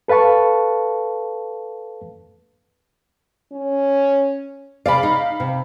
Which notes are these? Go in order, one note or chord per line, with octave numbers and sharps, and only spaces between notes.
A4 B4 F5 A5 C#6
C#4
C3 G#4 D5 F5 B5
D#4
C3